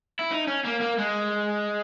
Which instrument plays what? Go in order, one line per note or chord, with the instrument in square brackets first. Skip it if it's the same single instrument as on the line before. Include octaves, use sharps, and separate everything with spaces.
[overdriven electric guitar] E4
D#4
C#4
A#3
A#3
G#3